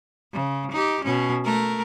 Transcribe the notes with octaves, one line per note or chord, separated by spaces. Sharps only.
C#3
D#4 G4
B2 C#4
A3 A#4